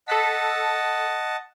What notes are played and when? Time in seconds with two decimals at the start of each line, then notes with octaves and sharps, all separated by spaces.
0.08 A4 D#5 F#5 A5 F#6 B6